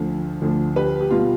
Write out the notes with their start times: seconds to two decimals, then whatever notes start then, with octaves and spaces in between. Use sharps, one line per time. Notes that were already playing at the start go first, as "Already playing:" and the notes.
Already playing: D2 D3 F3
0.42 D2 D3 F3
0.76 G4 B4
1.01 G4
1.11 B2 G3 F4